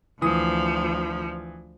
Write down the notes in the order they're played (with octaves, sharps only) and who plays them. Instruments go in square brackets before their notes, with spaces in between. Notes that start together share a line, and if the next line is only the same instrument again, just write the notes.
[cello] D2 F3 [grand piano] E3 D#6